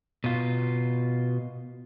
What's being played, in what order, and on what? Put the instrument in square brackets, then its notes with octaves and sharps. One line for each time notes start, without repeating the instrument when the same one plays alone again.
[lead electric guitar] B2 F4